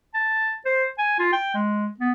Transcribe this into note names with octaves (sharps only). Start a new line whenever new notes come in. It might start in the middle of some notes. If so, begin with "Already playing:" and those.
A5
C5
G#5
F4
G5
G#3
B3